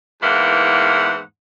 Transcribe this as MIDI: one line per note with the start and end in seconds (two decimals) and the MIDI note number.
0.22 1.19 40
0.22 1.19 44
0.22 1.19 52
0.22 1.19 58
0.22 1.19 78